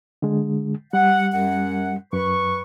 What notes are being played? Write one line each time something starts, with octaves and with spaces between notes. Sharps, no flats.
D3 G#3
G3 F#5
F#2 F#5
F#2 B4 C#6